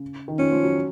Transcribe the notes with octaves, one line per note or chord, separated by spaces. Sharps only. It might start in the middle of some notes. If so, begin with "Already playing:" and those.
Already playing: C#3
D#3
F3 C#4
F3
F#3